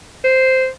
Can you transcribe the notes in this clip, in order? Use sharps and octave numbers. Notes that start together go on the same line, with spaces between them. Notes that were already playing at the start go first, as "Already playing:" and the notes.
C5